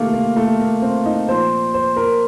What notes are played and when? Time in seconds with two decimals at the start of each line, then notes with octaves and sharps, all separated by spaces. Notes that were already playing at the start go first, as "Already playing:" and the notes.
Already playing: C3 D#3 A3 A#3 F4
0.13 A#3
0.36 A3
0.60 A#3
0.82 C4
1.05 D#4
1.28 A#2 F3 C5
1.74 C5
1.96 A#4